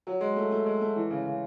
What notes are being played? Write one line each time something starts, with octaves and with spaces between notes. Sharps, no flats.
F#3
G#3
A3
A3
G#3
A3
E3
C#3
C#3